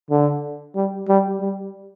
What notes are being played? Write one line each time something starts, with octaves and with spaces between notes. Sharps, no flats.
D3
G3
G3
G3